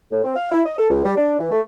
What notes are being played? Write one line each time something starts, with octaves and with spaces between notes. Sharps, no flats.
A2
C4
F5
E4
D#5
A4
C#2
G3
D4
E3
A3